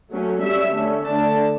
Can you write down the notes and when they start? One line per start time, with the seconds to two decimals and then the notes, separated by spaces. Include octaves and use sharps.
0.11 F#3 A3 C#4
0.42 G3 C#4 E5
0.74 D3 A3 C#4
1.05 D3 A3 D4 A5